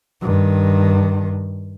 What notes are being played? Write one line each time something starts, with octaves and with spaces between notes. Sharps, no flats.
G2 D#3